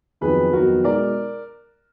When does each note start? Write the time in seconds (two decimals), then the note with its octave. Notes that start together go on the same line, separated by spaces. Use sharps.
0.21 F2 D#3 F#3 B3 D#4 G#4 B4
0.53 F2 D#3 F#3 B3 D#4 F#4 A#4
0.84 B2 G#3 D#4 A#4 D5